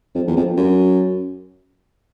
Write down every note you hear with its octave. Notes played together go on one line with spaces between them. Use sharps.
F2
E2
F2
F#2